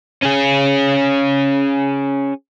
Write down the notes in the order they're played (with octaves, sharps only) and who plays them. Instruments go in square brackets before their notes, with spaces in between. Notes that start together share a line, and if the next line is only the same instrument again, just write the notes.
[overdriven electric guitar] C#4 G#4